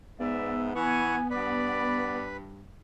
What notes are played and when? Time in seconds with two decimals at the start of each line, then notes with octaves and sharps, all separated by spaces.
0.20 G#2 B3 D5 E5
0.75 E3 F#5 G#5 C#6
1.31 G2 B4 D5 B5